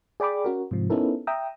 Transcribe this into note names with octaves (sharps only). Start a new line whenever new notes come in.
G#4 D5 G5 B5 D6
C#4 F#4 A#4
G#2 C3 F3
B3 C#4 D#4 E4 A4 A#4
E5 G5 A#5 D#6 E6